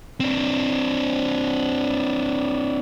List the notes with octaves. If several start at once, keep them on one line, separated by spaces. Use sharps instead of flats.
C4 D4